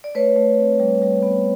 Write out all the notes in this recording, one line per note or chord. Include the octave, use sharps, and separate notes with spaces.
D5
A3 B4 C#5
A3
C4
G3
G3
B3